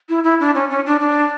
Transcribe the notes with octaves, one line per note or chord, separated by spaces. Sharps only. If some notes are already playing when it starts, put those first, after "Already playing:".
E4
E4
D4
C#4
C#4
D4
D4